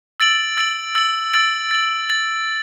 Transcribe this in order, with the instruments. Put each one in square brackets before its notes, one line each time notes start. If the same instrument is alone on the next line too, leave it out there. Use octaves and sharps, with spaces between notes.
[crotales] E6 A6 D7 F#7
E6 A6 D7 F#7
E6 A6 D7 F#7
E6 A6 D7 F#7
A6 F#7
A6 F#7